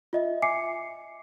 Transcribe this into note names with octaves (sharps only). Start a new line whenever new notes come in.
F4 D#5 E5
E5 G#5 D6 C7 C#7